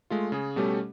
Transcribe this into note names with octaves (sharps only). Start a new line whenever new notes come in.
G#3 A3 F4
C#3 G#4
B2 G3 A3 C#4 G4 A4